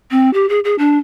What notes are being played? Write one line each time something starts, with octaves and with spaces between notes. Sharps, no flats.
C4
G4
G#4
G#4
D4